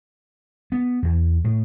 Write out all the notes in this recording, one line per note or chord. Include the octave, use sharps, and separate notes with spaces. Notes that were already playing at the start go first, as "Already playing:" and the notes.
B3
E2
A2